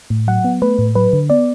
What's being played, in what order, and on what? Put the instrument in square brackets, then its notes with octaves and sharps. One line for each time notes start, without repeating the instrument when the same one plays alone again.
[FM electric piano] A2
F#3 F#5
B3
A3 B4
A2
F#3 B4
D3
B3 D5